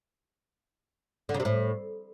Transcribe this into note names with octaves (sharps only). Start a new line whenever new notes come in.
D3
C#3
C3
A2